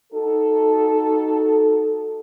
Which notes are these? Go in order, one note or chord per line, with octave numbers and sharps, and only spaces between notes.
D#4 F#4 A4